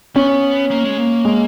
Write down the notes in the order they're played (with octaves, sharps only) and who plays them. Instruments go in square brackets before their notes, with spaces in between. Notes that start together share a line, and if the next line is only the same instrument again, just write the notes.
[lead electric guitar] B3 [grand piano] C#4
[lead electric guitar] A#3
G#3
A#3
[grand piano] G#3